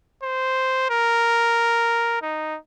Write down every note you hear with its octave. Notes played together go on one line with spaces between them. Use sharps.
C5
A#4
D#4